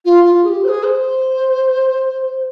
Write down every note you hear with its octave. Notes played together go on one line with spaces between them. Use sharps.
F4
F4
G#4
G4
C5
G#4
C5